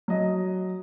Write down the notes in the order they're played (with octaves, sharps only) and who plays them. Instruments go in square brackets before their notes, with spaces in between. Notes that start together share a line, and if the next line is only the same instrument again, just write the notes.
[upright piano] F#3 D#5